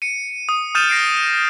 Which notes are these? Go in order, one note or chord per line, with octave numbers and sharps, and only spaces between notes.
C#7 D#7
D#6
D#6 F6 G6 A6 D#7 E7
A#6 C7 D7